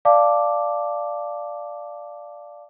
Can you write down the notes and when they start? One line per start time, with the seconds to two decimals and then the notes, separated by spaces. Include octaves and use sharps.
0.05 D5 F5 A5 D6